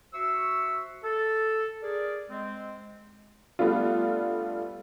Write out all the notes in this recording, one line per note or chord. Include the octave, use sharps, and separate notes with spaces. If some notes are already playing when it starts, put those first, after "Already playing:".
F#4 C5 E5 C#6 E6
A4
G#4 A#4 D5
G#3 C4
G3 A3 B3 D4 F4